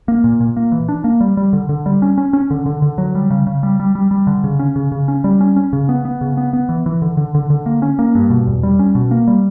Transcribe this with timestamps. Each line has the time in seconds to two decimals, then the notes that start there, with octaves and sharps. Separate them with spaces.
0.08 A#3
0.24 A#2
0.40 A#2
0.57 A#3
0.72 E3
0.89 D4
1.04 A#3
1.21 G3
1.37 G3
1.53 D3
1.69 D3
1.86 G3
2.02 C#4
2.18 C#4
2.33 C#4
2.50 D3
2.66 D3
2.82 D3
2.98 F#3
3.15 G3
3.30 C#3
3.47 C#3
3.63 G3
3.80 G3
3.95 G3
4.11 G3
4.27 D3
4.44 C#3
4.59 C#4
4.76 C#3
4.92 C#3
5.08 C#4
5.24 G3
5.41 C#4
5.56 C#4
5.73 C#3
5.89 B3
6.05 B3
6.21 C#3
6.37 B3
6.53 B3
6.69 E3
6.86 E3
7.02 D3
7.17 D3
7.35 D3
7.50 D3
7.66 A#3
7.82 C#4
7.99 A#3
8.15 G2
8.30 B2
8.47 E2
8.63 G3
8.79 C#4
8.95 B2
9.11 A#3
9.28 G3